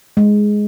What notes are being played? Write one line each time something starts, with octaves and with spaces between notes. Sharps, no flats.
G#3